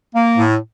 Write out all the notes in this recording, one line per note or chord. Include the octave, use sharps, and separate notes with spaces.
A#3
A2